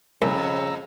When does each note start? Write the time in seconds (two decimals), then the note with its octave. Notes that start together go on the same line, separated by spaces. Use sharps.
0.22 C2 F2 C#3 A#5 E6